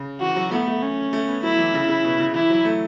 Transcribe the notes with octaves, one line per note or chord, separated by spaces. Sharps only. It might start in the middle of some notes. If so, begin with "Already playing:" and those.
Already playing: C#3
E3 F#4
F#3
A3 B3
A3
C#4
A3
B3
F#3 E4
E3
C#3
C#3
B2
C#3
E3 E4
F#3
A3